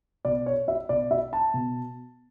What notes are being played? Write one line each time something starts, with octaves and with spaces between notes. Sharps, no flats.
B2 D5
C#5
E5
B2 D5
E5
A5
B2